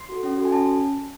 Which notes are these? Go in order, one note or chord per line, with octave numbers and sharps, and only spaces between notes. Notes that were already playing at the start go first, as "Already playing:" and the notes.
Already playing: C6
F#4 A4
C#4
F#4 A4
G#5
C#4 A5